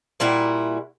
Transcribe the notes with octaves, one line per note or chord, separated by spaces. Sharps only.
A#2 G3 E4 F#4